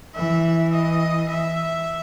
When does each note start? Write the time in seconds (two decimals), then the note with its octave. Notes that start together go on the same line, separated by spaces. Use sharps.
0.15 E3 E5
0.72 D#5
1.29 E5